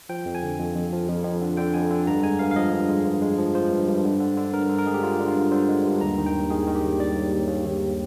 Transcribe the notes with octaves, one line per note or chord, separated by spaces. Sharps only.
F3 G5
F2
G#5
D3
F2
F2
F3
F2
F2
D3
D3 G5
F2 G#5
D3
G2 A#5
G#3 G#5
G2 F5
F5
F3 D#5
G2
G#3
G2
G#3
F3
F3 C5
G2
G2
D3
D3
D3
G2 A#4
D3
A#4
G#3 G#4
G4
D3 F4
D3
F4
G2
D3 C5
G#3
G2
D#2 A#5
D#3
G5
D#2
D#3 G#4
D#3
G4
D#2
G3 D5
D#2
D#2
D#2
D#2